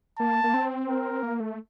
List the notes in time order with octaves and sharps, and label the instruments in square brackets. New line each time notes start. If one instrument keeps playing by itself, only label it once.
[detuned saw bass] A#3 [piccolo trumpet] A5
[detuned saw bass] A#3
C4
[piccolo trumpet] A#4
[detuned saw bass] A#3
A3